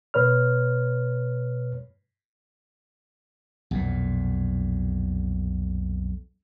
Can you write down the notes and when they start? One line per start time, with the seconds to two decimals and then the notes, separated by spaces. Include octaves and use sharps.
0.14 B2 B4 C#5 F6
3.71 B1 F2 A#2